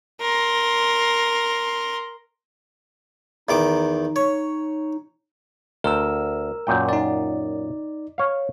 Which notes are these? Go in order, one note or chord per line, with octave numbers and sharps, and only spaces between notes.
A#4 C6
E2 D#3 D#4 D6
C#5
D2 A#4 E6
F#2 A#2 G5
D#4 D5
C#5 F5